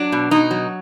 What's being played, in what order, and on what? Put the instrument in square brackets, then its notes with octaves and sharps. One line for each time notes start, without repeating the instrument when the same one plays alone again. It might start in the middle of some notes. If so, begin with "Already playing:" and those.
Already playing: [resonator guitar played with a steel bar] F#3 D4
B2
B2 D#4
F#3